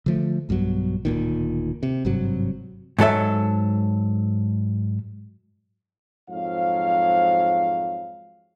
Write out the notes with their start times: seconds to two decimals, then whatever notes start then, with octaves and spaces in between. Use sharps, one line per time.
0.06 D3 F3 A3
0.49 B1 G2 B2 F#3
1.05 D1 A#2 D#3
1.83 C3
2.05 G#1 G2 C3 F#3
2.99 G#2 F#3 A4 E5
6.29 F2 G#2 F#3 F5